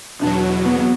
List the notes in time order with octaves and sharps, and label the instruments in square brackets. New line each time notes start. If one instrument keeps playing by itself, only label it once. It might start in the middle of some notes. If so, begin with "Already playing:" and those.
[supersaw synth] E2 B2 F#3 [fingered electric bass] D4
[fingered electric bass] B3
B3